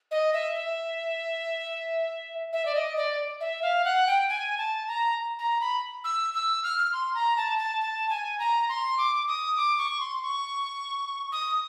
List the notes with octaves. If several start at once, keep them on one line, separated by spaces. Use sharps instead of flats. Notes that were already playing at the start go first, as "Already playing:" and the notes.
D#5
E5
E5
E5
D5
D#5
D5
E5
F5
F#5
G5
G#5
A5
A#5
A#5
B5
E6
E6
F6
C6
A#5
A5
A5
A5
G#5
A#5
C6
D6
D#6
D6
C#6
C6
C#6
D#6